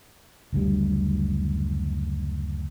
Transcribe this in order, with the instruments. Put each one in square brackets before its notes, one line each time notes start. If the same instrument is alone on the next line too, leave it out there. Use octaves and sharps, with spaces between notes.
[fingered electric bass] F#1 D2 G3